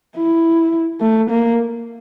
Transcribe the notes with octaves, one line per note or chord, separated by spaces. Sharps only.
E4
A3
A#3